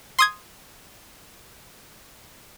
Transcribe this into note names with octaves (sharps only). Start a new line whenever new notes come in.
C6 D#6 G#6